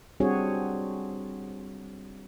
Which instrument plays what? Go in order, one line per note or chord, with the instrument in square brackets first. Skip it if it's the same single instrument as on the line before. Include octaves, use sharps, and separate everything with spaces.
[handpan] G3 C4 D4 F#4 G#4 C#5